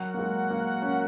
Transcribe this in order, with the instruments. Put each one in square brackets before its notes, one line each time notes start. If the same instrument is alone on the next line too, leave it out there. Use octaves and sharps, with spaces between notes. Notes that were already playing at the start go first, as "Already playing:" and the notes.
Already playing: [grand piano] F#3 [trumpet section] F#4 A#4 F#5
[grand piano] A#3
G#3
A#3
C#4